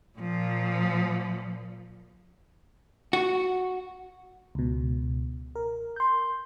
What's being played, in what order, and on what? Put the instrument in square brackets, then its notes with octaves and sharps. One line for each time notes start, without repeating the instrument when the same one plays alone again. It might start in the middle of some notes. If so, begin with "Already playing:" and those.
[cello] A#2 F3
[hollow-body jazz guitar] F#4
[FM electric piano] C#2 B2
A#4
[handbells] C6 G6